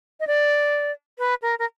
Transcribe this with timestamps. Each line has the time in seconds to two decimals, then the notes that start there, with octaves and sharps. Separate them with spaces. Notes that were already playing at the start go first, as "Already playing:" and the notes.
0.20 D#5
0.27 D5
1.18 B4
1.42 A#4
1.59 A#4